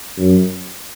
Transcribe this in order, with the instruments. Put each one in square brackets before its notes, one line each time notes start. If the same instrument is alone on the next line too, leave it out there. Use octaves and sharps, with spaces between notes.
[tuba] F#2